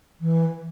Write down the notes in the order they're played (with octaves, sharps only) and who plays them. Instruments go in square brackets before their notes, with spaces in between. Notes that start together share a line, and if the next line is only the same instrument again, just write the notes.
[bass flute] E3